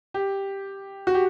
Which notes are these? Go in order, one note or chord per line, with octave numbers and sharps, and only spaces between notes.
G4
F#4
G4